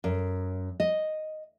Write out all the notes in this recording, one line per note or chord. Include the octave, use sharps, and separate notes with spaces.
F#2
D#5